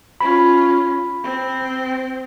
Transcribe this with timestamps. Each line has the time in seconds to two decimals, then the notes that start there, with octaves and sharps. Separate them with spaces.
0.21 C#4 F4 B5
1.23 C4